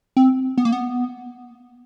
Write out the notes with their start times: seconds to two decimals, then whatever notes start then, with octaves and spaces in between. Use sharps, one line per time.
0.17 C4
0.58 B3
0.65 A#3
0.72 B3